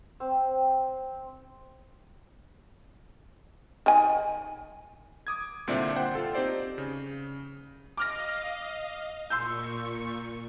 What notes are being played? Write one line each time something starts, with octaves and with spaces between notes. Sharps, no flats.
C4
D#3 G#5
D6 D#6 G#6
C2 A#2 D3 C4 D5 E5
C5 F#5 G5 C6
F4 A4
C4 D#4 G4 C5 D5
C#3
D#5 F5 D6 F6 A#6
A#2 C6 C#6 E6 G6